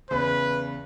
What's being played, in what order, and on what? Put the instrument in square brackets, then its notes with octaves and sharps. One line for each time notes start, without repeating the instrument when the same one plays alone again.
[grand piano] E2 C#3 [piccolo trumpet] B4